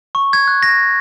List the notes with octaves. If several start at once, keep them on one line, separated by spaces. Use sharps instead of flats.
C#6
G#6
F#6
A#6